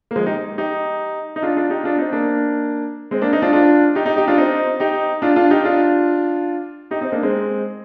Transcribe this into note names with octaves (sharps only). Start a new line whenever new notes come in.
A#3
F3 G#3
D#4 G4
D#4 G4
D#4
D4 F4
D4 F4
D#4 G4
D4 F4
C4 D#4
A#3 D4
G#3 C4
A#3 D4
C4 D#4
D4 F4
D4 F4
D#4 G4
D#4 G4
D#4 G4
D4 F4
C4 D#4
D#4 G4
D4 F4
D4 F4
D#4 G4
D4 F4
D#4 G4
C4 D#4
A#3 D4
G#3 C4